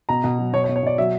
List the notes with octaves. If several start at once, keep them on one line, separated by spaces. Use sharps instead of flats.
B2 A#5
B2
F#3
B2 C#5
C#5
B2
C#5
B2 D5
F#3 E5